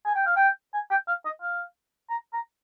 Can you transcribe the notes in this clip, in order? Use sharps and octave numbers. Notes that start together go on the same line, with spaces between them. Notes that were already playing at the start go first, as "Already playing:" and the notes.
G#5
G5
F5
G5
G#5
G5
F5
D#5
F5
A#5
A#5